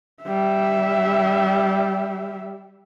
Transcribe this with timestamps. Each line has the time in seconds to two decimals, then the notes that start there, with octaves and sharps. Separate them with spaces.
0.23 G3 E5